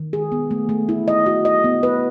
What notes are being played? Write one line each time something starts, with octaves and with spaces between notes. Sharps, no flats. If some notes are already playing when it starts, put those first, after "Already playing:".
Already playing: D#3
G#4
B3
A3
A3
E4
D#5
F#4
D#5
B3
B4